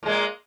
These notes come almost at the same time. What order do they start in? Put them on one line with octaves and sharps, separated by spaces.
A#2 G#3 A#3